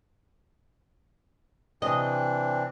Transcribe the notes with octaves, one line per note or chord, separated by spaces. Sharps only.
C3 E3 C4 D4 D#5